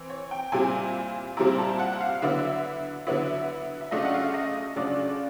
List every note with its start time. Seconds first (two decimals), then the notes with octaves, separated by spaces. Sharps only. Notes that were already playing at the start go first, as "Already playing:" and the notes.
Already playing: E3 C4
0.10 C#5
0.31 G5
0.52 A#2 G3 C4 E4 G#5
1.37 A#2 G3 C4 E4 A#5
1.58 A5
1.79 F#5
1.93 F#5
2.01 F5
2.22 D3 F#3 B3 E4 E5
3.07 D3 F#3 B3 E4 E5
3.81 E5
3.91 C#3 F#3 A3 D4 F4 D#5
4.05 F#5
4.14 F5
4.24 E5
4.34 D#5
4.76 C#3 F#3 A3 D4 F4 D5